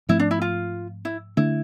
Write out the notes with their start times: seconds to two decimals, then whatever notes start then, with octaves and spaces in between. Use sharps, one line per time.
0.09 G#2 F3 A3 C4 E4
0.20 D4
0.31 E4
0.42 F4
1.05 E4
1.37 D3 A3 D4 E4